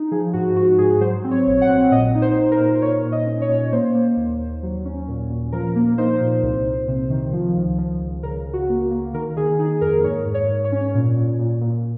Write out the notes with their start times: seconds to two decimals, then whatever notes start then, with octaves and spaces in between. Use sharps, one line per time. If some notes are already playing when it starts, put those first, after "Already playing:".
Already playing: D#4
0.11 F3 G#4
0.33 G#2 F#4
0.56 G#2 F#4
0.78 G#2 G#4
1.01 F#3 C5
1.24 C4
1.31 C#5
1.47 A#1
1.61 F#5
1.69 C4
1.91 A#2 D#5
2.15 D#4
2.22 C5
2.37 D#4
2.52 A#4
2.60 A#2
2.82 A#2 C#5
3.05 A#2
3.12 D#5
3.26 C#4
3.41 C#5
3.49 A#2
3.72 A#3 C5
3.95 A#3
4.17 D#2
4.39 D#2
4.63 F#3
4.85 C#4
5.08 A#2
5.30 A#2
5.52 F3 A#4
5.75 A#3
5.98 D#4 C5
6.21 A#2
6.43 C2
6.66 C2
6.88 C3
7.10 D#3
7.33 F3
7.56 C#2
7.79 F3
8.02 C#2
8.23 C#3 A#4
8.46 C#3
8.53 F#4
8.69 A#3
8.91 A#3
9.14 D#3 A#4
9.36 D#3 G#4
9.59 D#4 G#4
9.81 F2 A#4
10.04 G#2 C#5
10.27 G#2
10.34 C#5
10.49 G#2
10.65 C#5
10.72 C#4
10.94 A#2
11.17 A#2
11.39 A#2
11.62 A#2